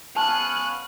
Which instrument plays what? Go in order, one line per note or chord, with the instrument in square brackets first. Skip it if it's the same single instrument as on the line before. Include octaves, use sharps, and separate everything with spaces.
[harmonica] B3 C#4 F5 [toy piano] A5 [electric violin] F#6